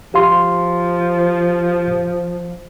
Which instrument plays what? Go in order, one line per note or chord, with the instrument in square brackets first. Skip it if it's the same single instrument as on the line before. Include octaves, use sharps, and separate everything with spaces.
[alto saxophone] F3 [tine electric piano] G4 F5 C6